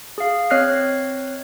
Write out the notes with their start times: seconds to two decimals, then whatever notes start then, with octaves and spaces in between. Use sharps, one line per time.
0.18 G#4 F5
0.50 C4 C#5 D#5 F6 F#6 C7